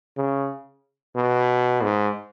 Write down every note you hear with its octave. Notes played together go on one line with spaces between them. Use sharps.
C#3
B2
G#2